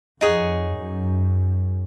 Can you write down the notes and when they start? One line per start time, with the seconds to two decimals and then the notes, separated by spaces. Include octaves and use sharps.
0.21 F2 D#4 G#4 C#5 F#5
0.74 F#2